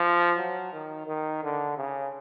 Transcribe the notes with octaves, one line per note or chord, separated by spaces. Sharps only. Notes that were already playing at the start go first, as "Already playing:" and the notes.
Already playing: F3
F#3
D#3
D#3
D3
C#3